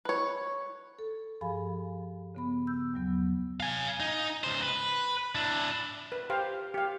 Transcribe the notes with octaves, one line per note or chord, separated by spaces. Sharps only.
B4 C#5
A4
G2 F3 G#4 F5 G#5 B5
C#3 B3 B5
E6 G6
D#2 F#3 B3
F5 G#5
D#4
C#2 C5
B4
D4 E4
B4
G4 C5 F5
G4 F5